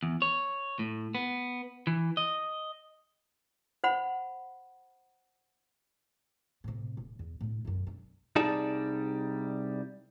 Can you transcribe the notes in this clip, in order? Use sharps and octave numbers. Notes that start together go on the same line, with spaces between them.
E2
C#5
A2
B3
E3
D#5
C5 F#5 B5
A2 C3
D1
E2
A2 D4
B1 F#2
D4
C2 G3 D#4 G#4 D5 A5